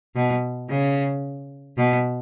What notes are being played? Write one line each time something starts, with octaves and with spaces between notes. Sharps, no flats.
B2
C#3
B2